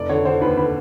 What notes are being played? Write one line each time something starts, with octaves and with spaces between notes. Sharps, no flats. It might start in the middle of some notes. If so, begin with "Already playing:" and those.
Already playing: F1 D5
D3 C#5
D3 C5
D#2 B4
D3 B4